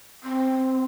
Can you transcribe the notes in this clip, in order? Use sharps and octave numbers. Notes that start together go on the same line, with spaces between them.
C4